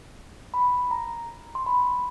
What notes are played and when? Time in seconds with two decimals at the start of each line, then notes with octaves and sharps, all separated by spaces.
0.54 B5
0.91 A#5
1.55 C6
1.66 B5